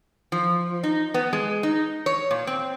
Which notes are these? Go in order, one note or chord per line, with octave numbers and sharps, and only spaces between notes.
F3
D#4
B3
G#3
D#4
C#5
A#2
C4